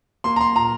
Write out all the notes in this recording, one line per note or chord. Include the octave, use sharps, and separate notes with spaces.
A#3 C6
A#5
C6
A#2 A#5